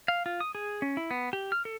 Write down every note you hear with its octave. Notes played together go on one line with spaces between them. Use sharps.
F5
F4
D#6
G#4
C#4
E4
B3
G4
F6
A4